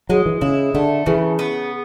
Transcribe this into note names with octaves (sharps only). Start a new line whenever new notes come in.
F#3 G#3
E3
C#3 E4
D3 A3
C#3 E3
B3